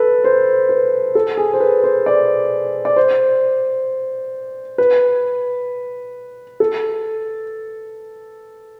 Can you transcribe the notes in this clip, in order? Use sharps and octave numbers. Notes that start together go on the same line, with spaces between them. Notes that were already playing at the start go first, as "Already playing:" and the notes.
Already playing: A4 B4
C5
B4
A4
G#4
C5
B4
C5
D5
D5
C5
B4
A4